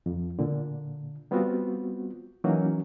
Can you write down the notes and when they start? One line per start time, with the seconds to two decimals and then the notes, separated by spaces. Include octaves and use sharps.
0.06 F2
0.39 A#2 D3
1.31 G3 B3 C4 F4 F#4
2.44 E3 F#3 A#3 C#4 D#4 F#4